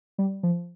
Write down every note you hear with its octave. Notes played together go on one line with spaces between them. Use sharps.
G3
F3